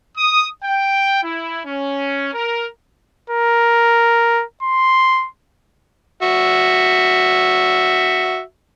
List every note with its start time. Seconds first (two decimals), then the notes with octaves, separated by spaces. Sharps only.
0.17 D#6
0.62 G5
1.22 E4
1.64 C#4
2.33 A#4
3.30 A#4
4.63 C6
6.22 F#4 E5